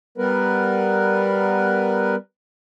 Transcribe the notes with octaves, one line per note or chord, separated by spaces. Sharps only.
G3 B3 A#4 B4